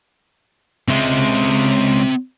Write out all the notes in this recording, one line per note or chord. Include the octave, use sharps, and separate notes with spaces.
C#2 G#3 C4 E5